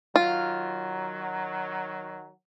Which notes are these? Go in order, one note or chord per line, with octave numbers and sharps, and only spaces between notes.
D#3 F#3 F4